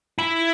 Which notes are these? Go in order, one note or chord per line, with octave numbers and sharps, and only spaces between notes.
E4